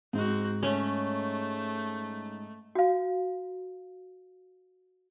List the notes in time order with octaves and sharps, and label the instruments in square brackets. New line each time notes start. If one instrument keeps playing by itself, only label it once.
[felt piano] G#2 [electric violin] C4 F#4
[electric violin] A3 [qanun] C#4
[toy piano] F#4 F5